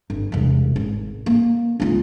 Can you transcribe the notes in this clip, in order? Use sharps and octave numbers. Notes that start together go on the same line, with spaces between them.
G1
E1 C2
G#1
A#3
C#2 F4